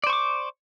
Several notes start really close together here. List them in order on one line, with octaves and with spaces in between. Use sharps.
D5 C5 C#6 D6